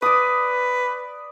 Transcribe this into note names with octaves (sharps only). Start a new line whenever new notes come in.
B4 D5 D#6